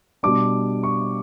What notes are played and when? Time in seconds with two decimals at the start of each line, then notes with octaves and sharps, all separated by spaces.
0.23 B2 G3 D4 D6
0.83 C#6